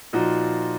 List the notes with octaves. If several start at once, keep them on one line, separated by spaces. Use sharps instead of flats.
A#2 F3 D#4 F#4